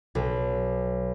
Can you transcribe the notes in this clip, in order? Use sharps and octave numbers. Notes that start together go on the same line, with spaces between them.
B1